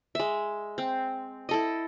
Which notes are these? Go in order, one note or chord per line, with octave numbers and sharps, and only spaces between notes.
G#3 E5
C4
E4 A4 D#5